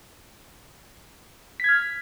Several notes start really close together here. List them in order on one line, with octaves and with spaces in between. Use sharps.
B6 G#6 F6